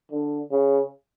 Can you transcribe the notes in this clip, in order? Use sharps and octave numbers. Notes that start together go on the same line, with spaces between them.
D3
C#3